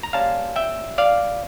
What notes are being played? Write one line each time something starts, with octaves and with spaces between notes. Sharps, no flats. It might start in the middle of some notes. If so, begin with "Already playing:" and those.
A#5
A#2 G3 C#4 F4 F5 A5
E5 G5
D5 F5